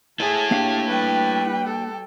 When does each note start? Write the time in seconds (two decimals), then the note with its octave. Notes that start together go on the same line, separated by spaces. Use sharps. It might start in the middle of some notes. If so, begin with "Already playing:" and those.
0.20 E4 G#4 A4 A5
0.51 A#3 D4 G4 F5
0.89 G3 B4 G5
1.66 A4